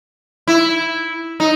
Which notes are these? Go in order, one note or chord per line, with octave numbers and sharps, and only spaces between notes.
E4
D#4